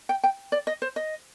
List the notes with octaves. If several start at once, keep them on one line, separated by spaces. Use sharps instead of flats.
G5
G5
D5
D#5
C5
D#5